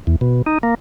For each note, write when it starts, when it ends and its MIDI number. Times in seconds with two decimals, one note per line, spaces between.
0.07 0.16 40
0.21 0.42 47
0.46 0.58 63
0.63 0.75 58